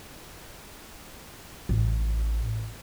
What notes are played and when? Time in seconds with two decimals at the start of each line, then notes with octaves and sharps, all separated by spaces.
1.69 A1